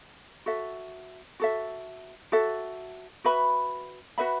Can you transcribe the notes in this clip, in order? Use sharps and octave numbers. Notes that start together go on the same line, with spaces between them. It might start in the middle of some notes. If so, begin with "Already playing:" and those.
F#4 A4 E5
F#4 A4 E5
F#4 A4 E5
F#4 B4 E5 B5
F#4 B4 E5 B5